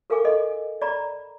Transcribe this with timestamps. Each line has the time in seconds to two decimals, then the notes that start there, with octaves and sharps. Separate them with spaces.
0.10 A4 A#4 F5 G5 G#5 D6
0.24 A4 D#5
0.82 D5 A#5 B5